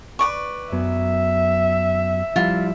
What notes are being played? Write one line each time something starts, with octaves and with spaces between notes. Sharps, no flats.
B4 D5 C#6
F#2 F#3 B3 E5
F3 G3 E4 F4